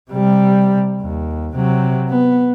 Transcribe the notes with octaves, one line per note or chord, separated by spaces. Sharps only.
C3 G3
D#2
C3 F#3
B3